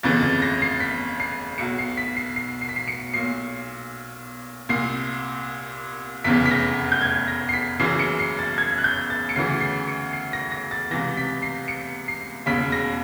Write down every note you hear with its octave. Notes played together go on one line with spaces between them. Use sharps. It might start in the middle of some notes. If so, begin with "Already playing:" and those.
G1 F2 C#3 E3 A6
A6
A#6
C7
B6
C7
B1 B2 C#7
C7
B6
C7
C7
C7
B6
C7
C#7
B1 A#2 C7
C2 A#2 C7
F1 E2 C#3 E3 B6
B6
A#6
G6
G#6
A#6
C7
B6
F#1 F#2 C#3 E3 C7
C#7
C7
A6
G#6
F#6
G6
A6
C#7
D2 C#3 E3 C7
C7
C#7
C7
A#6
A#6
A6
C#2 C3 E3 A#6
B6
C7
C#7
C7
E1 D#2 C#3 B6
A#6